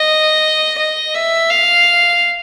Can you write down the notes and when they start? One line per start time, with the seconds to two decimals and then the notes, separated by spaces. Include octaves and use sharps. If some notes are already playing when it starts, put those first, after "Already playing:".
Already playing: D#5
0.79 D#5
1.15 E5
1.50 F5